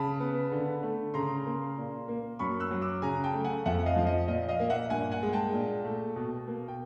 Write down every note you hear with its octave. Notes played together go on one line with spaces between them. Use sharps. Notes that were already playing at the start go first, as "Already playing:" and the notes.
Already playing: C#3 A5 B5
B3
D3
A3
C#3 A#5 C6
A#3
A#2
A#3
F#2 B5 C#6
E6 F#6
F#3
D6 E6
C#3 G#5 A#5
G5 A5
A3
F#5 G#5
F2 E5 F#5
D#5 F5
F3
D#5
A#2 D#5
D#5 F5
A#3
E5 F#5
G2 F#5 G#5
F#5 G#5
G#3
G5 A5
A#2
A3
B2
A#3
G5